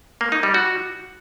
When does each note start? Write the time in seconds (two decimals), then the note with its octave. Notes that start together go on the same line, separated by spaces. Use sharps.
0.21 A#3
0.32 D#4
0.43 G3
0.54 F#4